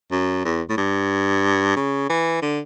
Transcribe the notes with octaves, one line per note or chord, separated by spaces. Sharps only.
F#2
E2
A2
G2
C#3
E3
D3